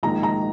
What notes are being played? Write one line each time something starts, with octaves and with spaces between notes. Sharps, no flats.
A#1 G#2 D#3 A#5
A#5